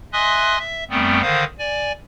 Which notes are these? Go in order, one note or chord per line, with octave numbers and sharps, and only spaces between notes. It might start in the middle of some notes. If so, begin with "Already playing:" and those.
D#5 E5 G#5 C6 D#6 F#6
E5
F#2 G3 A3 B3 C4
D3 D#3 C5 F5 D#6
D5 G#5